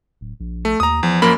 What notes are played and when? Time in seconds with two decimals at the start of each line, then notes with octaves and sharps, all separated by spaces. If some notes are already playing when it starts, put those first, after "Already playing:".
0.21 D1
0.40 A#1
0.65 A3
0.80 D#2 A#5 D#6
1.03 E2 F3
1.22 F#2 A#3 B5